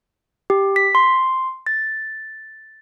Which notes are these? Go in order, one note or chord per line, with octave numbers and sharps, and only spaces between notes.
G4
B6
C6
A6